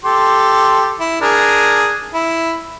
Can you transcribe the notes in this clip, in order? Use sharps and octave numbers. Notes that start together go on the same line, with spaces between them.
G4 A4 C6
E4
D4 G#4 A#4
E4